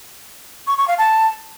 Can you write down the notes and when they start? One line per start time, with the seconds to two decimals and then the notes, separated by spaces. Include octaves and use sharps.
0.67 C#6
0.78 C#6
0.88 F5
0.98 A5